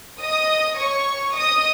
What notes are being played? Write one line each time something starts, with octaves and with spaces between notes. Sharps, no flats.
D#5 D#6
C#5 C#6
D#5 D#6